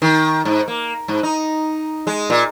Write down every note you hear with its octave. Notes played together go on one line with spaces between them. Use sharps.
D#3
G#2
A#3
G#2
D#4
G#3
A#2